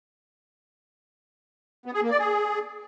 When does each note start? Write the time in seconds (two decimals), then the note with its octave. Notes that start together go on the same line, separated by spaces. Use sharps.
1.86 B3
1.94 G#4
2.02 A#3
2.11 D5
2.19 G#4